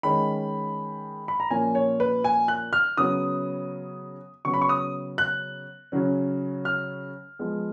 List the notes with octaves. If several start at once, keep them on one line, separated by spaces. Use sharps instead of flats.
D#3 G#3 C#4 B5
B5
A#5
A#2 F3 A#3 C#4 G#5
C#5
B4
G#5
F#6
F6
C#3 F#3 B3 D#6
C#3 F#3 B3 C#6
B5
C#6
D#6
F#6
C#3 F#3 C#4
F6
F3 G#3 B3